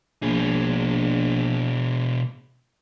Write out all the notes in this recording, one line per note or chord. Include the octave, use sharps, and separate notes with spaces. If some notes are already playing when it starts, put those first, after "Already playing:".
A#1 B2 G#4